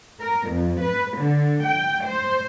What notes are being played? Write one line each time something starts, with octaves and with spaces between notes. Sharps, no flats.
A#4
F2
B4
D3
G5
C5